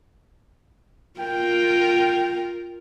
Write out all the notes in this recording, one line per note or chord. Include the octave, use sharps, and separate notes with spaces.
F4 A#4 G5